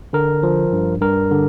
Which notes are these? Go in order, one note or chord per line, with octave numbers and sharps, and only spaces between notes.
D3 A#4
F3
G2
G2 A#4
D3